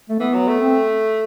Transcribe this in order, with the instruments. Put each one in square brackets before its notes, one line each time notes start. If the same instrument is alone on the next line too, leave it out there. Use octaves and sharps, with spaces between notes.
[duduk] A3
[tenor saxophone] E3 [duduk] B3
[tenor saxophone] F#3
A3
[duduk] C4